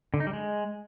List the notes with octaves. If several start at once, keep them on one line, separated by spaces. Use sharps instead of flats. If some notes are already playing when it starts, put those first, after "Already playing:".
D3
D#4
G3
G#3